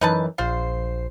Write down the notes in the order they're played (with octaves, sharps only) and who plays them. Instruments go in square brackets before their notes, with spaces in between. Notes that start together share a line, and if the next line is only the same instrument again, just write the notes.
[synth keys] F#2 E3 [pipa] D#4 B4 A5
[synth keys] A#1 C5 C7 [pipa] F4